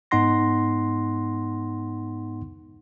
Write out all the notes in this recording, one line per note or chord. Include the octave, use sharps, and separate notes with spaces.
G#2 B3 D#4 F#5 C6 A#6